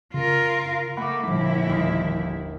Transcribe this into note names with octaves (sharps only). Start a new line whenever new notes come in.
C#3 F4 A#4
A3 A#3 F#5 B5 D6
G1 A#2 F3 E4
D#2